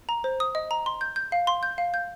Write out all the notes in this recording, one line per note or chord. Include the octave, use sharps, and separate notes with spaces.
A#5
C5
D#6
D#5
A#5
C6
G6
G6
F5
C6
G6
F5
G6